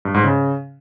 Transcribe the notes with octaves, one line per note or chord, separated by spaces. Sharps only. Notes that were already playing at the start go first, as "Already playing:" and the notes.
G2
G#2
C#3